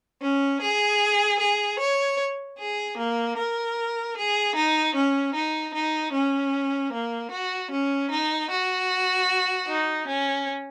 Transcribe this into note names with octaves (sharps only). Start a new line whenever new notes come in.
C#4
G#4
G#4
C#5
G#4
A#3
A#4
G#4
D#4
C#4
D#4
D#4
C#4
A#3
F#4
C#4
D#4
F#4
D#4
C#4